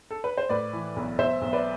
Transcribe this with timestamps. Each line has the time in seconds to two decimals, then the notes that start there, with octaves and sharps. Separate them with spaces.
0.11 A4
0.24 B4
0.37 C5
0.49 A2 B4 D5
0.73 E3
0.96 B1
1.18 B1 C5 E5
1.41 B1
1.53 B4 D5